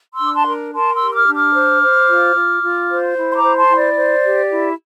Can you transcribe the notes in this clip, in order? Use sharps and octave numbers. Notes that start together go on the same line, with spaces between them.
C6 E6
D4 D6
A5 C6
A#4
A#4 A5 C6
C6 E6
G4
E6
D6 F6
D4
D6 F6
C5
C5
F4
F4
F4
C5
E4
C6
A#5 D6
C5
A5 C6
E4
D5
C5
G4
E4